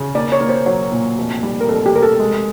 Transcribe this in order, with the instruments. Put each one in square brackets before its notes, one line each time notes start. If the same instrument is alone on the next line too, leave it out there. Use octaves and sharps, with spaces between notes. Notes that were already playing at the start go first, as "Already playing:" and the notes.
Already playing: [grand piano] C#3
[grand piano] A#3 [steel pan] D5
[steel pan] C#5
[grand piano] A#3
[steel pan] C5
[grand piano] F#3 [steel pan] C#5
[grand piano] A#2
F1
G3
[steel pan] A#4
[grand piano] F1 [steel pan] A4
[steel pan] G4
[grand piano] F1 [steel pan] A#4
[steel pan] A4
[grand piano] G#3